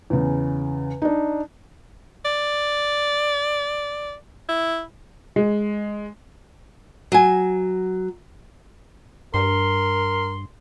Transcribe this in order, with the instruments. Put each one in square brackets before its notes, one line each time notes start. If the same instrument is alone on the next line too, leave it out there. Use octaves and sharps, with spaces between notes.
[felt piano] E2 C#3
D4 D#4
[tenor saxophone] D5
E4
[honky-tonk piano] G#3
[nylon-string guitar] F#3 G#5
[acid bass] G2 [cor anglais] A#4 [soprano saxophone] C6